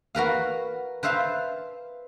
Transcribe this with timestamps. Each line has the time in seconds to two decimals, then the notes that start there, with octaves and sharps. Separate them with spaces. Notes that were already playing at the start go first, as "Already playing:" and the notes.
0.15 F#4 A#4 B4 F5
1.03 B4 C5 E5 F5 A5